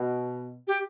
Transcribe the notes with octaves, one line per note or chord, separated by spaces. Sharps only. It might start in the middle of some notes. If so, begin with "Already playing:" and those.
Already playing: B2
G4